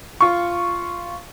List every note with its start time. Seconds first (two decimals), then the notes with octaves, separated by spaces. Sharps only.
0.21 F4 C#6